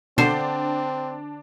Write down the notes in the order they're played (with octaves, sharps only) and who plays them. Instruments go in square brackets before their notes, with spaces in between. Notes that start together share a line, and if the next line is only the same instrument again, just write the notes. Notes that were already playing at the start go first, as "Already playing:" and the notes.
[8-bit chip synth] B2 [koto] D3 C5 [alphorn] C4 [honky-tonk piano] D4